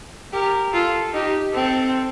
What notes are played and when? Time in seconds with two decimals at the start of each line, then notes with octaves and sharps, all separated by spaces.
0.33 G4 A#4
0.73 F4 A4
1.14 D#4 G4
1.54 C4 A4